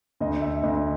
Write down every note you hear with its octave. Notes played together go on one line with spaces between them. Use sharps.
D2 D#5
E5
D2 D#5